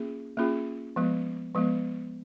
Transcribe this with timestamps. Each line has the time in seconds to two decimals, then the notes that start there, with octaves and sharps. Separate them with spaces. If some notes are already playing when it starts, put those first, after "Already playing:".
Already playing: A#3 C#4 F4 G#4
0.37 A#3 C#4 F4 G#4
0.96 F3 G#3 B3
1.55 F3 G#3 B3